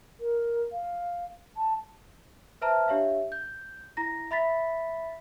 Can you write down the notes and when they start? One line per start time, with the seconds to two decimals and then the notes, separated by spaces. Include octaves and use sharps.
0.20 A#4
0.72 F5
1.57 A5
2.62 B4 C5 E5 A5 A#5 F6
2.88 D4 G4 C#5 E5 F5
3.32 G6
3.97 E4 A#5 A#6
4.31 E5 B5 A6 B6